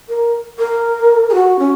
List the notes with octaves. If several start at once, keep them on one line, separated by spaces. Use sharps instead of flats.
A#4
A#4
G#4
F#4
C#4